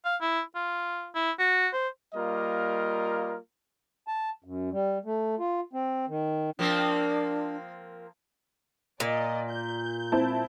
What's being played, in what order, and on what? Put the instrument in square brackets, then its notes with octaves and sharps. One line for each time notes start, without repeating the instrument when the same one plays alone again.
[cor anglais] F5
E4
F4
E4
F#4
C5
[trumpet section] G3 A#3 F4 A#4 D#5
[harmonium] A5
F#2
G3
A3
F4
C4
D#3
[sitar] F3 A#3 C4 [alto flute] D4
[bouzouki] A#2 [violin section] D5 D#5
[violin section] G6
[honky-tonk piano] C4 E4 A5